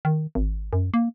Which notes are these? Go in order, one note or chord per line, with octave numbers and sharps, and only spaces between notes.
D#3
G#1
F#2
A#3